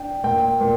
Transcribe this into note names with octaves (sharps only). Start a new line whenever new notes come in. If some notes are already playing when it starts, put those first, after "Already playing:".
Already playing: D4 G5
A#2 G5
A#2